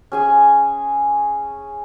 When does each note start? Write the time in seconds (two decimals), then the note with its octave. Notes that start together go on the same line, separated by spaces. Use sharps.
0.12 C#4 G#4 G#5